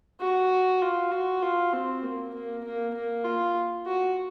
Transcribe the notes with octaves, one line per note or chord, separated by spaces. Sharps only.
F#4
F4
F#4
F4
C4
A#3
A#3
A#3
A#3
F4
F#4